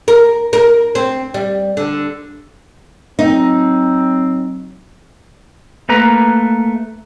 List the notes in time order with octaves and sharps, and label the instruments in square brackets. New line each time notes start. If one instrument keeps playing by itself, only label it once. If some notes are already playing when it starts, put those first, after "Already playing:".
[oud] A#4
A#4
C4
G3
D3
[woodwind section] F#3 C4 [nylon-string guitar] D#4
[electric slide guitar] A3 A#3 B4 A#5